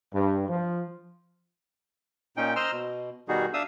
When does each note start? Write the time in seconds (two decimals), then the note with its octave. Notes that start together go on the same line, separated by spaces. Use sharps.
0.13 G2
0.48 F3
2.37 A#2 C#4 D#4 G5
2.56 C5 D#5 A#5 C6 E6 F6
2.72 B2
3.28 B2 D#3 G3 D#4 F#4 G#4
3.54 D4 E5 F5 D#6 E6